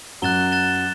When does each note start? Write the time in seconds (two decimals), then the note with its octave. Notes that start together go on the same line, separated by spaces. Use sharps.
0.22 F#2 F#3 F#6 A6 E7 G7
0.52 F#6 A6 E7 G7